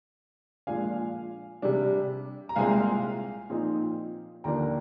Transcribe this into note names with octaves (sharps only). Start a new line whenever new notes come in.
A#2 F3 G#3 D4 F5 G#5
C3 G3 D4
A#5
C2 A#2 G#3 C4 F5 G#5
A#2 F3 C4 D#4
D#2 D3 F3 A#3 D4 G5 A#5